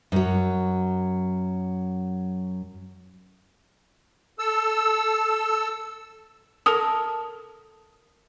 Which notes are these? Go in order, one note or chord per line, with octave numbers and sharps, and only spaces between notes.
F#2 F#3
A4 E6
A4 A#4 D#6